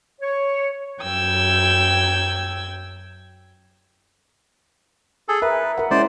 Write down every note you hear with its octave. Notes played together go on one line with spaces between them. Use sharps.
C#5
F#2 G5 E6 G#6
G#4 A4
A#4 B4 E5
A#4 F#5
G#3 C#4 E4 C5 D5